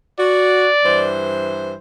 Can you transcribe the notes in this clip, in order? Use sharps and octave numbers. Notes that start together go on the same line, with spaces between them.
F#4 D5
G2 E3 C5